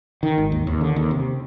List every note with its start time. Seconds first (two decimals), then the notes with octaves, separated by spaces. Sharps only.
0.23 D#3
0.38 G#1
0.52 D#2
0.67 D#2
0.81 D3
0.96 D#2
1.11 C3